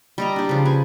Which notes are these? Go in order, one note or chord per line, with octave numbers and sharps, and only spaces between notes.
G3 D#5 A#5
D4 G4
C#3 F3
B4 G#5